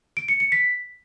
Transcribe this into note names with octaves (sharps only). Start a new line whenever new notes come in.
D7
C#7
C#7
B6